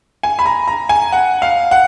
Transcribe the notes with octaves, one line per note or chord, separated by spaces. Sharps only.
G#5
B5
A#5
A#5
G#5
F#5
F5
F#5